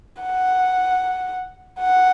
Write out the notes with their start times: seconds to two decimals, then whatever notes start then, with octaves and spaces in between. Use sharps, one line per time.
0.22 F#5
1.80 F#5